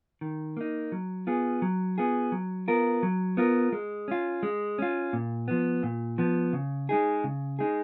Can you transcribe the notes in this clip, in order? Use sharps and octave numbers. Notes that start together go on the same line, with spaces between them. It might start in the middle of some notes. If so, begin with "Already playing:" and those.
D#3
A#3 D#4
F#3
B3 F4 G#4
F#3
B3 F4 G#4
F#3
B3 F4 A#4
F#3
B3 F4 A#4
G#3
C#4 F4
G#3
C#4 F4
A#2
F3 B3
A#2
F3 B3
C#3
G#3 D#4 G#4
C#3
G#3 D#4 G#4